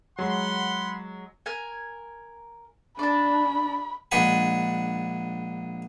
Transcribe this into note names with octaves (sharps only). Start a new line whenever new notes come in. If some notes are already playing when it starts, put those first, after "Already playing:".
F#3 G#3 F#5 B5 C6
A#4 G#5
D4 D5 A5 B5
A#1 G#3 D4 F#5 G#5 B5